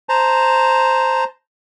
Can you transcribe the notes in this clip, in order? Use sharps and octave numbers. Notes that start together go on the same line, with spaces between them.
C5 A5 A#5